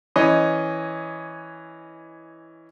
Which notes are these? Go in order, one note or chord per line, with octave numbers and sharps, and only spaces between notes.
E3 C#4 D#5